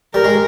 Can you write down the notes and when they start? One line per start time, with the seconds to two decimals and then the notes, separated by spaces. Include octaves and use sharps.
0.14 G3 A#4
0.24 G#3